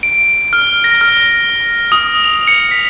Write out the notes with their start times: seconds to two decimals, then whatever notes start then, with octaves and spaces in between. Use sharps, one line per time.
0.03 D7
0.53 F6
0.84 A#6
1.01 F6
1.92 D#6
2.24 F7
2.48 C#7
2.71 B6